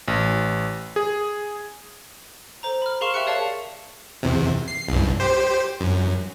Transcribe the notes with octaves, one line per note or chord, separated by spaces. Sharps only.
A1
G#4
A4 C5 A#5
B5 F6
G#4 A#4 F5 C6 C#6 E7
G4 E5 G5 C#6 F#6 C#7
G#4 C#5 D5 F5 A5
E2 C3
C7
C2 G2
G4 C5
F#2